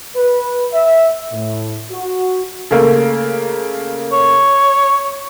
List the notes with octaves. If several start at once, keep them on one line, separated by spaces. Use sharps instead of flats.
B4
E5
A2
F#4
C#3 A3 A#3
C#5